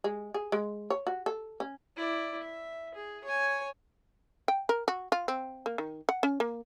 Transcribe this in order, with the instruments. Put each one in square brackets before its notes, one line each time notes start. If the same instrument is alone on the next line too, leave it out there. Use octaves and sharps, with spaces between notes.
[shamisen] G#3
G#4
G#3
C#5
F#4
A4
C#4
[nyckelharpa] E4 D5
E5
G#4
C#5 G#5
[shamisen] G5
A#4
F#4
F4
C4
A#3
D#3
F#5
C#4
A#3